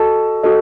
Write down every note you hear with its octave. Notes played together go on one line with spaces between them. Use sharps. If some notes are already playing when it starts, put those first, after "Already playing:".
Already playing: F#4 A4 D#5 A5
F#4 A4 D#5